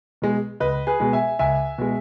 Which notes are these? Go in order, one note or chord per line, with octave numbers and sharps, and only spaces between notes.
B2 G#3
C#2 B4 D#5
G#4 B4
B2 G#3
E5 G#5
C#2 E5 G#5
B2 G#3